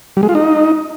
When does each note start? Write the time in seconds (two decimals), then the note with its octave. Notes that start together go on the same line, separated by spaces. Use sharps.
0.17 G3
0.23 G#3
0.29 F4
0.35 D#4